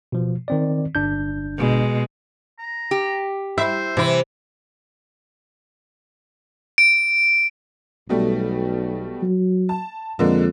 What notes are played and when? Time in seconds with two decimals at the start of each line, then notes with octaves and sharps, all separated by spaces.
0.12 B2 F3
0.48 D#3 C4 D5
0.95 G1 D4 G6
1.58 B2 G#3
2.59 A#5
2.91 G4
3.58 E4 C5 E5
3.97 C3 E3 E4
6.78 D7
8.09 B1 B2 G3 A3
9.22 F#3
9.69 A5
10.19 F2 D3 G#3 A#3